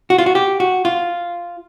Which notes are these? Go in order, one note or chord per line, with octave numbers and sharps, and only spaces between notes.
F#4
F4
F#4
G4
F#4
F4